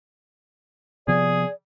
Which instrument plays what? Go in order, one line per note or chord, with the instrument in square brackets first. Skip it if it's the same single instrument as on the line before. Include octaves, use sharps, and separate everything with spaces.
[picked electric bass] C3 F3 B3 [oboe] G#4 [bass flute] D5